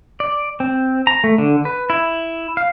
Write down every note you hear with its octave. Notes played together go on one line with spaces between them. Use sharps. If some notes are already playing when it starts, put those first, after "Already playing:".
D5
C4
A#5
A3
D3
B4
E4
F5